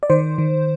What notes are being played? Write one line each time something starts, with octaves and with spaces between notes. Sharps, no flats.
D5
D#3 C5
D#3